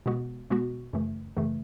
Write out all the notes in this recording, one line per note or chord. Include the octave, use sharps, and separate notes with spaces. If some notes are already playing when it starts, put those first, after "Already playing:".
B2 G#3 B3 F#4
B2 G#3 B3 F#4
F#2 C#3 E3 A3
F#2 C#3 E3 A3